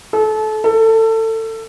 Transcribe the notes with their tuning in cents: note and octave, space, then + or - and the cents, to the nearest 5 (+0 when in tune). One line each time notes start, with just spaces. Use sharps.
A4 -30
A4 +25